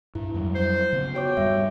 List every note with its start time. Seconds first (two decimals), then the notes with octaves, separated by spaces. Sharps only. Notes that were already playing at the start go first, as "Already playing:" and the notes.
0.15 G2 E4
0.34 F2 F#3 G3
0.55 C5
0.93 C#3 B3
1.15 F#4 C#5 G5 D6
1.37 E2 G2 G3 E5